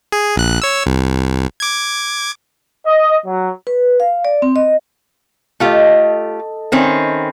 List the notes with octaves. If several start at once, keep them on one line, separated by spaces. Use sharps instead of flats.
G#4
A#1 F#6
C#5 E6
C2
D6 G#6
D#5
F#3
B4
F5
D5
C4
D#5
A3 F4 G4 A4 D#5
D#3 C4 C#4 E5 B5